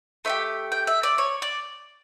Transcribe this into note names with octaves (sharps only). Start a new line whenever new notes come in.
A3 E4 G4 E5
G5
E5
D5
C#5
D5